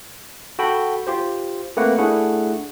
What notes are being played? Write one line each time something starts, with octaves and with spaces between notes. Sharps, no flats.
F#4 A4 G5 B5
F4 G4 C5
A3 A#3 C4 B4 F#5
A3 D4 E4 G#4 F#5